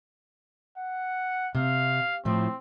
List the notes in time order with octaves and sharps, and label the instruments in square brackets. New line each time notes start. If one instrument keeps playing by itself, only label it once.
[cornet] F#5
[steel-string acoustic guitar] C3 [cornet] F5
[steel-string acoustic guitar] A2 F3 [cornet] C4